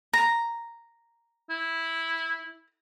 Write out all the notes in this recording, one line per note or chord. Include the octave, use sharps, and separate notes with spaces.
A#5
E4